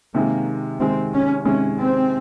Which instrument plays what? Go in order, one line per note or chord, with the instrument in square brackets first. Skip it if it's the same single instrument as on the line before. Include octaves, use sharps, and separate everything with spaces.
[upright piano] C3 D#3 G#3 [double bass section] A#3
[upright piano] C3 D#3 G#3 [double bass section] C4
[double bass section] C#4
[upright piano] C3 D#3 G#3 [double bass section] C#4
[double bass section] C4